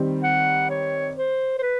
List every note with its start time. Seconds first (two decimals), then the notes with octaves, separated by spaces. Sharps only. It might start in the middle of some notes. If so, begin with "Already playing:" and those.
Already playing: D#3 G3 C4
0.23 F#5
0.70 C#5
1.17 C5
1.58 C5
1.62 B4